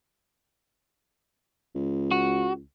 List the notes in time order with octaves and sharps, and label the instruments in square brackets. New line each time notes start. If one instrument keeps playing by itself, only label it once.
[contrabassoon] C#2
[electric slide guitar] F#4